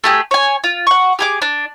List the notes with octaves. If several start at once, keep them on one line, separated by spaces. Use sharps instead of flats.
A3 G4 G#4
C#5 G#5
F4
F#5 C#6
G4 G#4 D6
D4